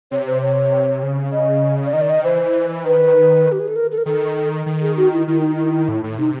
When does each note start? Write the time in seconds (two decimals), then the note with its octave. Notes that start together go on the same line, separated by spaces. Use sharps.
0.11 C3 C#5
0.27 C5
0.41 C#5
1.03 C#3
1.32 D#5
1.86 D5
1.93 D#3 D#5
2.01 D5
2.09 D#5
2.24 E3 C5
2.84 D#3 B4
3.52 G4
3.59 G#4
3.68 A4
3.76 A#4
3.91 A4
3.98 A#4
4.05 D#3 A4
4.66 D#3
4.82 G#4
4.97 F#4
5.12 E4
5.27 D#3 E4
5.41 D#4
5.55 E4
5.88 A2
6.04 A2
6.18 C3 D#4